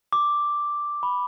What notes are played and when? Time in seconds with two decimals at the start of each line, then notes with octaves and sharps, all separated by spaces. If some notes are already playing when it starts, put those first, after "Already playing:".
0.13 D6
1.03 B5